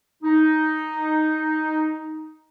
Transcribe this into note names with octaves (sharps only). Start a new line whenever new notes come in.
D#4